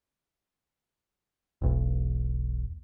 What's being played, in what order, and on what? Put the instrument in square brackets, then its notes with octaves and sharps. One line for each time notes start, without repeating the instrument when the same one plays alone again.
[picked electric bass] E1 B1